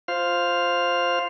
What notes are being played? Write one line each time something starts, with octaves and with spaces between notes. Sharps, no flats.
F4 C5 F5